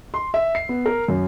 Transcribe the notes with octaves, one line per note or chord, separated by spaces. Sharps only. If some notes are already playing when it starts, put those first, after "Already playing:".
C6
E5
C7
B3
A#4
F#2